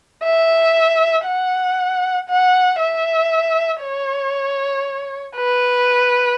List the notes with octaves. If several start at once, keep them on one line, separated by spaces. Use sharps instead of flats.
E5
F#5
F#5
E5
C#5
B4